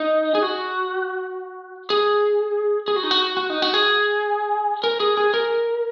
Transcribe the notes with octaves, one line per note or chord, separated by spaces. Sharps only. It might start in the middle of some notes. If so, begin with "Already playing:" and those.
Already playing: D#4
G#4
F#4
G#4
G#4
F#4
D#4
F#4
F#4
D#4
F#4
G#4
A#4
G#4
G#4
A#4